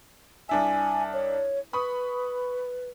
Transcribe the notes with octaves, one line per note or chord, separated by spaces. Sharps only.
C2 D4 E5 G#5
C#5
B4 B5 C#6 D#6